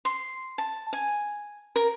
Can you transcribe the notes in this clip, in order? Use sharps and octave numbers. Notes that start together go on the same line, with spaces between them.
C6
A5
G#5
A#4